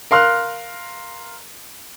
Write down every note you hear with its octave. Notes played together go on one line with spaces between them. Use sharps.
A#4 F5 C6 F6 F#6